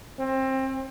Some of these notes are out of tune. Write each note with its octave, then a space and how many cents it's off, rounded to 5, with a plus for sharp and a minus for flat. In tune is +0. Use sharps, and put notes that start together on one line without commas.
C4 +25